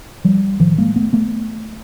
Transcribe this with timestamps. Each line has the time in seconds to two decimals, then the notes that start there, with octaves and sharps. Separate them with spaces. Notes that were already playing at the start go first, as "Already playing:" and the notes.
0.25 F3 G3
0.60 A2 D#3 F3
0.78 G#3 A#3
0.96 A3 B3
1.13 A3 B3